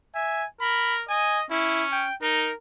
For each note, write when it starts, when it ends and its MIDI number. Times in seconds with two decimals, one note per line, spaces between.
0.15 0.45 76
0.15 0.45 80
0.61 1.02 70
0.61 0.95 83
1.09 1.43 75
1.09 1.39 80
1.50 2.06 61
1.50 1.84 64
1.92 2.15 79
2.22 2.48 63
2.22 2.55 70